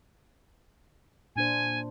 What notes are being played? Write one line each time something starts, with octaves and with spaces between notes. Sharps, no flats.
A#2 D4 C5 G#5